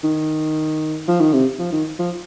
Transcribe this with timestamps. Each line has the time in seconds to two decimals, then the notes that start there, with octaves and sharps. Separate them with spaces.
0.04 D#3
1.08 F3
1.21 D#3
1.33 C3
1.59 F3
1.72 D#3
1.99 F3